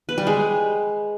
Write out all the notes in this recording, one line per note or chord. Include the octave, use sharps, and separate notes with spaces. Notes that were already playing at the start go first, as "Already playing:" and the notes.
B4
G3
G#3